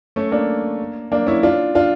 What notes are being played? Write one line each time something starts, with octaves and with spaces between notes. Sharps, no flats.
A3 C#4
A#3 D4
A#3 D4
C#4 E4
D4 F4
D4 F4